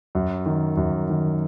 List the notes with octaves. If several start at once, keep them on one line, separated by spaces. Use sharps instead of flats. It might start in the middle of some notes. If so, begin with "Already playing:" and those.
F#2
D#3
F#2
D#3